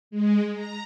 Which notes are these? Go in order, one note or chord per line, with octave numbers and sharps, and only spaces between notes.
G#3
A#5